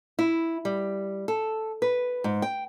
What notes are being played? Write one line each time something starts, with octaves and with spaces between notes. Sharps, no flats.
E4
G3
A4
B4
G#2
G5